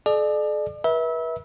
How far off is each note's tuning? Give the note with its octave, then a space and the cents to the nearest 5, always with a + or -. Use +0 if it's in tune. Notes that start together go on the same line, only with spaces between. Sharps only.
A4 -45 D5 +35
B4 -35 E5 -25